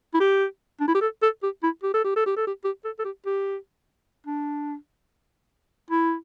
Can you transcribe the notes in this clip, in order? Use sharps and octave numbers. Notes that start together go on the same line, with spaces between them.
E4
G4
D4
E4
G4
A4
A4
G4
E4
G4
A4
G4
A4
G4
A4
G4
G4
A4
A4
G4
G4
D4
E4